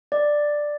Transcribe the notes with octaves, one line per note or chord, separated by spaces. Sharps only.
D5